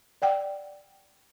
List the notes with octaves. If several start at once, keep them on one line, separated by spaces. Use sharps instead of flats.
D5 F#5 G5